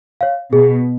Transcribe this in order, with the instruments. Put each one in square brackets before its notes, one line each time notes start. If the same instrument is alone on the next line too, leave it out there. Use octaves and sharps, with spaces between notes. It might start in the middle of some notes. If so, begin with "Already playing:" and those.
[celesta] C#5 F5
[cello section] B2 [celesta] G#4